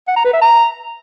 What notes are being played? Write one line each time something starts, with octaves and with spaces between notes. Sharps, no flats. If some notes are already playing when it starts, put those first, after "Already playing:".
F#5
A#5
B4
E5
A#5